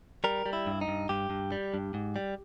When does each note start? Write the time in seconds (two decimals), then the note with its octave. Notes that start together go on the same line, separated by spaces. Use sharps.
0.24 G3 A#4
0.46 G3
0.53 E4
0.66 G2
0.81 D#4
0.88 G2
1.09 G2 G4
1.30 G2
1.52 G3
1.74 G2
1.94 G#2
2.16 G3